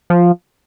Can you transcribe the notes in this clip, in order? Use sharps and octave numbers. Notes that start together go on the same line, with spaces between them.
F3